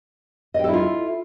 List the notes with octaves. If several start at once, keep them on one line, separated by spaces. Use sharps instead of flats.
E4 F4 A4 D#5 G5